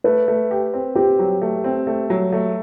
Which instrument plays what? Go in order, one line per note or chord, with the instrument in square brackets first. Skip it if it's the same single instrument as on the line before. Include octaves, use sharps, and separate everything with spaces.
[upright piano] A3 [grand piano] B4
[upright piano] A3
G4
C4
[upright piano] C4 [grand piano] G4
[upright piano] F#3
A3
C4
A3
F#3
A3